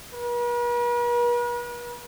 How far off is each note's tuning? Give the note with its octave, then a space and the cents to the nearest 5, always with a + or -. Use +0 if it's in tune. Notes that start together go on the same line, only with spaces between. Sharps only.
B4 -45